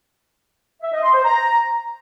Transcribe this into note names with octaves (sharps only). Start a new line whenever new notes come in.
E5
D#5
C6
C5
A#5